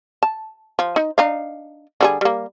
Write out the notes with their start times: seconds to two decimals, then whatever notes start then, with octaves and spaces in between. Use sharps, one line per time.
0.23 A5
0.79 F3
0.96 D#4
1.18 D4 D#4 F5
2.01 D3 G3 G#4
2.21 G3 A#3